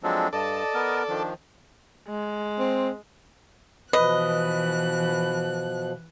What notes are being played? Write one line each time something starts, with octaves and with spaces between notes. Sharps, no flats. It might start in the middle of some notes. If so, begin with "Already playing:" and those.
F3 F#3 G#3 C4 D4 A4
G2 A4 D5 D#5 A5
B3 A#4
D#3 F3 D4
G#3
C4
B2 E3 F3 B4 D#5 F#6